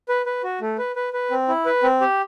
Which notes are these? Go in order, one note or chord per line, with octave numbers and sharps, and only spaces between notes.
B4
B4
F#4
A3
B4
B4
B4
C4
E4
B4
C4
G4